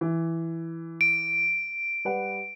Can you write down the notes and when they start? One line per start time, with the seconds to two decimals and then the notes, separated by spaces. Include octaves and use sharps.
0.01 E3
1.01 D7
2.05 G3 B4 F#5